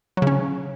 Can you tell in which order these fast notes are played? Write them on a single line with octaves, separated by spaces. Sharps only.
F#3 C#3 C#4